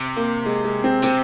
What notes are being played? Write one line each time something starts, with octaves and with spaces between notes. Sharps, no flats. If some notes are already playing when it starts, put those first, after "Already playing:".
Already playing: C3
A#3
G#3
G#3
C4
C3 C4